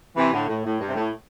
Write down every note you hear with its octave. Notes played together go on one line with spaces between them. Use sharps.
C3 E3
A2 D3
A2
A2
G2
C3
A2